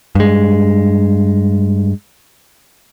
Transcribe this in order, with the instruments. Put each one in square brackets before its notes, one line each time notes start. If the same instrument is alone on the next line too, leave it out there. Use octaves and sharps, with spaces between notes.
[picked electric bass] G2 G#3